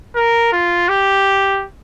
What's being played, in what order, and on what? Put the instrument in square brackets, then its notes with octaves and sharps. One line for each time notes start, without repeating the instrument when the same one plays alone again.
[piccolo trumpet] A#4
F4
G4